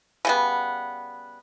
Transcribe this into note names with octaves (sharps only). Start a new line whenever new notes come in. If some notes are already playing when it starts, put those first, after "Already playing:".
C#3 G3 B3